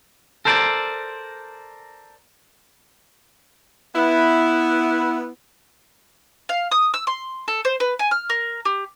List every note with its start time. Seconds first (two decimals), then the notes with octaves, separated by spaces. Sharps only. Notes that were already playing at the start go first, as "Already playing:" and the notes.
0.45 A4 A#4 C5 D5
3.95 B3 E4
6.49 F5
6.72 D#6
6.94 E6
7.07 C6
7.48 A4
7.65 C5
7.80 B4
7.99 G#5
8.11 F6
8.30 A#4
8.65 G4